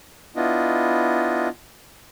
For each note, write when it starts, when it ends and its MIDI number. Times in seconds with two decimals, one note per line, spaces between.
0.36 1.48 59
0.36 1.48 62
0.36 1.48 64
0.36 1.48 65
0.36 1.48 75